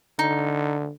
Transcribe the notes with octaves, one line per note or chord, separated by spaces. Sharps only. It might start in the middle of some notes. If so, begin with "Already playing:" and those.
D3 D#4